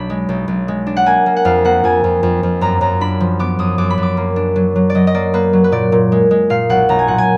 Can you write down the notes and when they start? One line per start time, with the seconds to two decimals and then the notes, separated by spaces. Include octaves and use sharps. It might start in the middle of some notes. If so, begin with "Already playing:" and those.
Already playing: B1 D4 B5
0.10 G#3
0.29 B1
0.48 B1
0.68 G#3
0.87 D4
0.97 F#5
1.06 A#3 G#5
1.26 A#3
1.36 F#5
1.45 F2 F5
1.65 A#3 F#5
1.84 F2 G#5
2.04 F2
2.23 F2
2.43 F2
2.61 F#2 A#5
2.81 F#2 A#5
3.01 D4 B5
3.20 F3
3.39 B3 D6
3.59 F#2 D#6
3.78 F#2 D6
3.90 B5
3.98 F#2
4.03 D6
4.17 A#3
4.36 D4
4.56 F#3
4.76 F#3
4.90 D5
4.95 F#3 D#5
5.07 D#5
5.14 A#3 D5
5.34 A#3 B4
5.53 F#3
5.64 B4
5.72 A#2 D5
5.92 A#2
6.12 G#3
6.31 G#3
6.50 A#2 F5
6.69 B1 F#5
6.89 B1 A#5
6.99 G#5
7.08 A#2 F#5
7.18 G#5